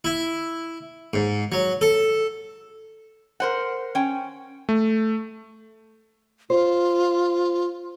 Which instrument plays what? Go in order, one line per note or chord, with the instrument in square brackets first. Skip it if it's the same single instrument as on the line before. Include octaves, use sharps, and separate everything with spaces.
[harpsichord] E4
G#2
F#3
A4
[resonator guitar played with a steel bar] A#4 C5 F#5
C#4 G5
[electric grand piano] A3
[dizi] F4 [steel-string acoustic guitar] C5